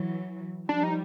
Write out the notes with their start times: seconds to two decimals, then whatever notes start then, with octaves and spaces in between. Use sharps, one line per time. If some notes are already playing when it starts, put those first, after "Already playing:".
Already playing: E3 F#3
0.68 F3 G3 D4
0.83 D#4